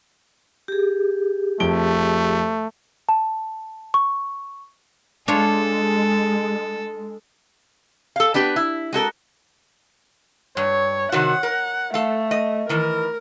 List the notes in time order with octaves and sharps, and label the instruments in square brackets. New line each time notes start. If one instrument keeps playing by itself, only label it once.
[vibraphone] G4 G#4
[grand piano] F2 D7 G7 [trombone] A3
[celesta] A5
C#6
[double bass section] G#3 [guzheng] D4 F4 C#5 [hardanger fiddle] A4
[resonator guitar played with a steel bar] A4 F5
B3 D4 G4 B4
E4
G#3 F#4 A4 A#4
[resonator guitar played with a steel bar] G2 [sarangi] C#5
[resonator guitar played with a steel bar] C3 D#3 F#4 [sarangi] F#5
[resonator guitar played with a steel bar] A#4
[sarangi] A3 [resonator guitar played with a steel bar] A4 F5
[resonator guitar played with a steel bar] D#5
[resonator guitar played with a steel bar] D#3 E3 [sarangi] A#4